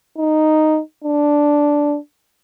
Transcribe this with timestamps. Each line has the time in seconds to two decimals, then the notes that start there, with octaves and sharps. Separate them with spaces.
0.18 D#4
1.05 D4